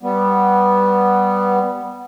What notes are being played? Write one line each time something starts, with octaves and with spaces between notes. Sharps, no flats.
G3 B3